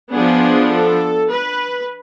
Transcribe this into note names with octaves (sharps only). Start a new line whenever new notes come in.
F3 B3 D4 G#4
A4
B4